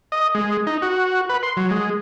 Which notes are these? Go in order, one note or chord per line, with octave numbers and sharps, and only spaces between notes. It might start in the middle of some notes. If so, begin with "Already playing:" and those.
D#5
G#3
D#4
F#4
B4
C6
F#3
G#3